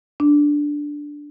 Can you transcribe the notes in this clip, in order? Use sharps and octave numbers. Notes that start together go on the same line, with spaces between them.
D4